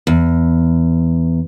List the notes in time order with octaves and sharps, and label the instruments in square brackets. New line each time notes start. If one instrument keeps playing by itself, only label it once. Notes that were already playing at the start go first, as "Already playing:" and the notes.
[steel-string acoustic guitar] E2